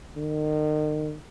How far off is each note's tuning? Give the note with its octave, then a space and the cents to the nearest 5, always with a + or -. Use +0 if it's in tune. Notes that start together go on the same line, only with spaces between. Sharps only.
D#3 -35